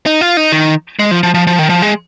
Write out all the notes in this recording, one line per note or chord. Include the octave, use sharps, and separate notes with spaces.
D#4
F4
D#4
D#3
G#3
F3
F3
F3
F3
D#3
F3
G#3